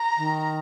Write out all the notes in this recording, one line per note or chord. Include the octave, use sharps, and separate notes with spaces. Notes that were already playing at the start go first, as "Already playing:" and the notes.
Already playing: A#5
D#3